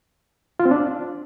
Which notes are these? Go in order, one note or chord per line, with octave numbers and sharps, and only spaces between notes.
F4
C4
D4